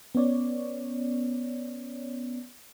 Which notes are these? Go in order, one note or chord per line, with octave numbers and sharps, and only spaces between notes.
B3 C#4 C#5 D5